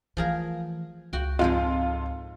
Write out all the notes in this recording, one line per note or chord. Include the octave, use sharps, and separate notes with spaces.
E3 F3 A3 G#4 A#4
C#2 F#4 G5
F2 G#2 F3 G#3 F4